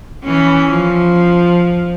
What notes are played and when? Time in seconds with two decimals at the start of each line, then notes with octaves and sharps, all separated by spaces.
0.24 E3 C#4
0.71 F3